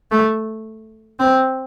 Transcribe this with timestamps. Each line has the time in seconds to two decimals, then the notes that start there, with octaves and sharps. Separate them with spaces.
0.11 A3
1.20 C4